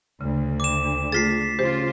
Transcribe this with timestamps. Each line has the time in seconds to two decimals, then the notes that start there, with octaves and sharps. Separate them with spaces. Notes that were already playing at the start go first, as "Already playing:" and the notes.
0.21 D2 C#3
0.60 D6 E7
1.12 A3 F4 G#4 A6 B6 C7
1.59 C#3 F4 G4 C5